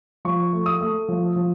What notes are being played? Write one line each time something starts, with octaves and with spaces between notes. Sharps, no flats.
F3 C#6
A3
D#6
A3
F3
F3